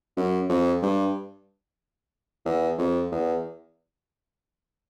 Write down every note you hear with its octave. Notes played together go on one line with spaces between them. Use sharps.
F#2
F2
G2
E2
F2
E2